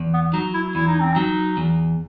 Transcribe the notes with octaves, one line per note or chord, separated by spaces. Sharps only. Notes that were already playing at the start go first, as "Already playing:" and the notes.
Already playing: E2
B3
F#3 D#4
E4
E2 E4
D#4
C4
F#3 D#4
E2